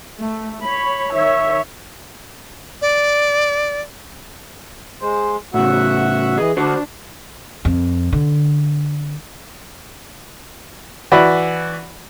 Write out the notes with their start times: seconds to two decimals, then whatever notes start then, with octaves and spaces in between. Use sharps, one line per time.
0.17 A3
0.64 C#5 B5
1.12 D#3 C#5 E5
2.82 D5
5.02 G#3 C5
5.54 A2 C#3 F#4 E5 F#5
6.38 E3 G#4 D#5
6.57 D3 D4 F#4 C5
7.65 F2
8.13 D3
11.12 E3 F#4 D5 E5 B5 F#6